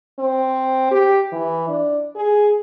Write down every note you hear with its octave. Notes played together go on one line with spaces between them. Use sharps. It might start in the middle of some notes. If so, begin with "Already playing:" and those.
C4
G4
E3
D4
G#4